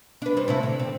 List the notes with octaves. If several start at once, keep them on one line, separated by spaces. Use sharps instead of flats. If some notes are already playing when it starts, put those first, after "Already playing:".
D4 B4
G3 B4 C5
A2 C3 E4
D3
C4